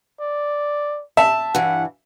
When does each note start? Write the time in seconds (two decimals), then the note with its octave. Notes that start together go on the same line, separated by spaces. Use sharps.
0.20 D5
1.17 E5 A5
1.55 G2 E3 F#5